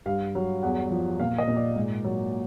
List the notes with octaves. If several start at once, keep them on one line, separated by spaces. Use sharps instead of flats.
G2 F5
F#3
E2 F#5
F3
A#2 F5
D#5
A#2
D5
G#2
F#3